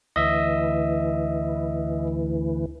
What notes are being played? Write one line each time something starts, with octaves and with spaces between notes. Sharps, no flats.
D2 E3 D#5 E5